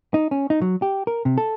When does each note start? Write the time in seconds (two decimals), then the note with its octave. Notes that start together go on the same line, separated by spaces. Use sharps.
0.14 D#4
0.31 C#4
0.50 D#4
0.62 F#3
0.82 G4
1.07 A#4
1.25 C3
1.38 A4